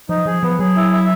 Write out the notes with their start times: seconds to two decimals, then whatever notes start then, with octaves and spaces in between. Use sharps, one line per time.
0.09 F3 D#4
0.26 F3 G#4
0.43 F3 B3
0.59 F#3 G#4
0.76 E4
0.93 E5